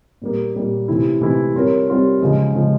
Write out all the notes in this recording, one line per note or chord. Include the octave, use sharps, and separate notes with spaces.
A#2 G3 A#3
A#2 G3 A#3
C3 E3 A3 C4 E4
C3 E3 A3 C4 E4
G3 C4 F4 A#4 C#5
G3 C4 F4 A#4 C#5
C#3 F3 G#3
C#3 F3 G#3